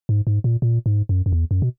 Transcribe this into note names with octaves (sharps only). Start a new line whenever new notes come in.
G#2
G#2
A#2
A#2
G#2
F#2
F#2
E2
F#2
B2